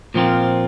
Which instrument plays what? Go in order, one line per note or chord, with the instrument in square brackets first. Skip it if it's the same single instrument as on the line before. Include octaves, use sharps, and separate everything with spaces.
[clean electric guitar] A#2 F3 C4 F4